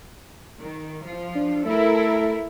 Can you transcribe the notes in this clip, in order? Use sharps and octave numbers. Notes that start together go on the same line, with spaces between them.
D#3
F3 F4
D4
A3 E4 A4 A#4